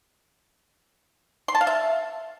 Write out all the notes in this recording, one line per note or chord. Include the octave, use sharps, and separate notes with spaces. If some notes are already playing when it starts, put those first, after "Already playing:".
C6
A5
F5
E5